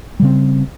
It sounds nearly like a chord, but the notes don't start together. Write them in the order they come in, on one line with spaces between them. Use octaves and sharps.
G3 C#3 C4